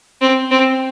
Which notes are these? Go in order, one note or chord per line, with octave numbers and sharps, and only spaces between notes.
C4
C4